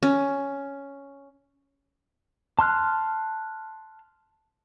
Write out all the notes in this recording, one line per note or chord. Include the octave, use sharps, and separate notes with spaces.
C#4
A5 C6 F6 F#6